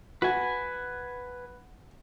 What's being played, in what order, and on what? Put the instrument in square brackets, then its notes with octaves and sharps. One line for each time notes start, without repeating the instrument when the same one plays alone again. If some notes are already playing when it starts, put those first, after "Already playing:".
[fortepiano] F#4 [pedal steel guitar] B4 G#5